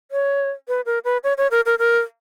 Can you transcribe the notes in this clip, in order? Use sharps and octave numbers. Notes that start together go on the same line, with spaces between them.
C#5
B4
A#4
B4
C#5
C#5
A#4
A#4
A#4